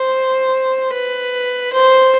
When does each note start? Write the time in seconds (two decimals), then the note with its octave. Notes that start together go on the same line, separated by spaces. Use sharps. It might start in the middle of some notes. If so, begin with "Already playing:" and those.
Already playing: C5
0.93 B4
1.73 C5